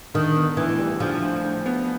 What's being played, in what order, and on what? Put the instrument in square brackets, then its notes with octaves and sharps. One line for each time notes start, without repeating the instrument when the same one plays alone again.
[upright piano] D3 [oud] D#3
[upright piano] B3
[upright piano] D2 [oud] E3
[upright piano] G3
[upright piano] D3 [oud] F3
[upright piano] D2
D2
B3